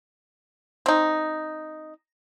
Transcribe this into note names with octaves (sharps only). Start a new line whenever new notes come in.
C4 D#4